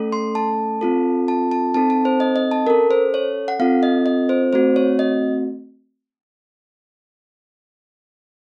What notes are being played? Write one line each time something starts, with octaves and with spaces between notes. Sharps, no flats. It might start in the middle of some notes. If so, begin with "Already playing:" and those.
Already playing: A3 C#4 A4
C6
A5
C4 F4 A4
A5
A5
C4 D#4 A4 A5
A5
C5
D#5
D#5
A5
C#4 A4 A#4
C5
C#5
F#5
C4 F4 A4 F5
D#5
D#5
C5
A3 C4 F#4 C5
C#5
D#5